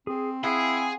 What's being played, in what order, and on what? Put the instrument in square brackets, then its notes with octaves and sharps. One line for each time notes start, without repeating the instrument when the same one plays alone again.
[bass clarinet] C4 [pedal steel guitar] G#4
[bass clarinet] C4 [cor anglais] E4 [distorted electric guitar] G#4 [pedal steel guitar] F5 F#5 D#6